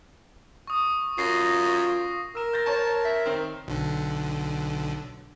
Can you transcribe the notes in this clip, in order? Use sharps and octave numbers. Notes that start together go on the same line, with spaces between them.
C#6 D#6
F#2 F4 A#6 C7
A#4 E6 E7
G6 A6 A#6
C5 C#5 A5 A#5
E5
D#3 C4
B1 D3